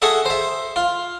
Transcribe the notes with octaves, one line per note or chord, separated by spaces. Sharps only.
F#4 G#4 A4 E5
C5 E5
F4